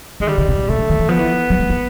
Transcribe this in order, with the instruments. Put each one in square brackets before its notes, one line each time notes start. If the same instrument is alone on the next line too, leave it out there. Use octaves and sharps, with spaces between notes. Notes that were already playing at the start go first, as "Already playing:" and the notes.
[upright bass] D#3 [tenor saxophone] G#3
[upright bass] D3 [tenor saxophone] G3
[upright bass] C#3
C3
B2
[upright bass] C3 [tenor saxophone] A3
[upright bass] D3
D#3
E3
[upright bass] F3 [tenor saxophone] B3
[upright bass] E3
F#3
G3
A#3